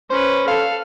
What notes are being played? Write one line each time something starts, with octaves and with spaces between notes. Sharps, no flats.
C#4 B4 C5
A4 F5